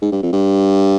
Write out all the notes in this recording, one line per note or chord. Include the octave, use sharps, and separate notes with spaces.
G#2
G2
F2
G2